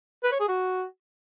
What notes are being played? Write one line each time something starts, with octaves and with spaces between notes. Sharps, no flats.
B4
C#5
G#4
F#4